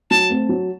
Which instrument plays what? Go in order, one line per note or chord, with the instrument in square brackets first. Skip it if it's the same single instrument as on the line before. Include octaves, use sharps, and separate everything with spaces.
[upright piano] F#3 [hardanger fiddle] A5
[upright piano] A3 C4
F#3